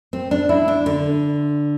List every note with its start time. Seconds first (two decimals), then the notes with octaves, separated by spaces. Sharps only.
0.13 C4
0.31 D4
0.49 E4
0.68 D4
0.86 D3